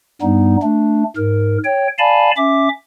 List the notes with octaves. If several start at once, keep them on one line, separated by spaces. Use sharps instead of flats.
G2 G3 B3 D#4
A3 D4
G#2 A#4
C#5 G5
D5 F5 G#5 A5 B5
C#4 E5 D6